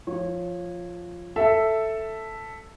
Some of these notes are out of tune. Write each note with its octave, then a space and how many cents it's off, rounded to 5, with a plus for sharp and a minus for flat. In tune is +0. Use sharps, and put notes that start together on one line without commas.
F3 +0 C#5 -20
A4 +5 E5 +0